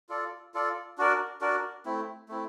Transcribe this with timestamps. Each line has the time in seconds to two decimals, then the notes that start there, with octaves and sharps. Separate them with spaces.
0.09 F4 A4 D5
0.54 F4 A4 D5
0.98 D4 F#4 A#4 D5
1.41 D4 F#4 A#4 D5
1.85 A3 C4 E4
2.29 A3 C4 E4